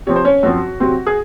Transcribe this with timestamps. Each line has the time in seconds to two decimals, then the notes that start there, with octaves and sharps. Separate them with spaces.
0.07 C3 F3 C4 C#5
0.16 C5
0.25 C#4 C#5
0.43 F#2 F3 C4 F#4
0.80 C3 F#3 C4
1.06 G#4